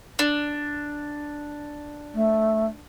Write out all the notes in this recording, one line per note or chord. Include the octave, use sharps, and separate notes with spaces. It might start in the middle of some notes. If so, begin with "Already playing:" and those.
D4
A3